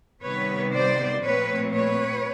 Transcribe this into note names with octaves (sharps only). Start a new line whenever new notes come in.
C3 D#3 G3 B3 B4 C#5
C5 D5
A#2 F3 A3 C4 B4 C#5
B4 C#5